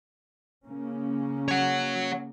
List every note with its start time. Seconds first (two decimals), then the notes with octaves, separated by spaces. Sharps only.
0.66 C#3 A#3 C#4
1.48 C#5 F#5